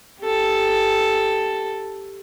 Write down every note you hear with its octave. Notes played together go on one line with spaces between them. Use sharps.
G4 A4